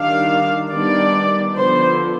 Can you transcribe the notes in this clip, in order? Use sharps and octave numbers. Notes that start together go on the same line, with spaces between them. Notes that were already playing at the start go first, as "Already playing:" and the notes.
Already playing: D#3 G3 D4 F5
D#3 G3 B3 D4 D5
D3 F3 B3 C5